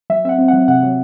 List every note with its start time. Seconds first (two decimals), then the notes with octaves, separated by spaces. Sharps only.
0.10 F#3 E5
0.25 C4 E5
0.29 F#5
0.38 C4
0.48 F#3 F#5
0.68 C3 F#5
0.83 F#3